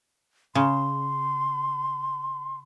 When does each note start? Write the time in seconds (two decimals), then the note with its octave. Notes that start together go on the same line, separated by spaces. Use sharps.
0.55 C#3 C6